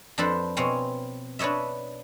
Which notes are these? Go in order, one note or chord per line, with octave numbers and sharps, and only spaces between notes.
F2 D4 A4 B4 C5
B2 C4 C#5 F5 G#5
D4 B4 C#5 D#5 E5